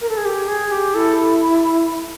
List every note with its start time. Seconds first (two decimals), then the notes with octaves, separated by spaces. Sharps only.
0.01 A#4
0.09 A4
0.17 G#4
0.25 G4
0.48 G#4
0.71 G4
0.94 E4 A4